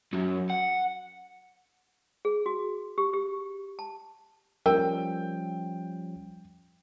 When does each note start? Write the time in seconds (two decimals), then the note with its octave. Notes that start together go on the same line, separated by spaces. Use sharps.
0.13 F#2 F#3
0.50 F#5
2.25 G#4
2.46 F#4
2.98 G4
3.14 G4
3.79 A5
4.66 F3 G3 C#4 A#4 G5